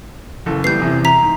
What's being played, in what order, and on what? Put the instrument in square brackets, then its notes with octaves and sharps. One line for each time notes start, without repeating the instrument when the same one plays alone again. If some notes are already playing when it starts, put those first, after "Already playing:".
[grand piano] F#1 E3 A4
[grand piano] E3 G3 B3 [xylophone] G6 C7
[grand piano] E2 C3 E3
[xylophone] A#5 B6
[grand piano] G#2